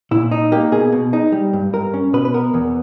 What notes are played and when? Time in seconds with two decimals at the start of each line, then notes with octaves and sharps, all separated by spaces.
0.11 A#2 E4
0.31 D#4
0.52 A#3 G4
0.72 B2 G#4
0.92 B2
1.13 D#4
1.32 G3
1.53 G2
1.73 G2 A#4
1.94 C#4
2.13 B2 B4
2.25 B4
2.34 B3 A#4
2.54 E2